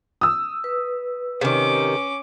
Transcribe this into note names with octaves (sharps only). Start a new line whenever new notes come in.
D#6 E6
B4
C3 D#3 C#4 D6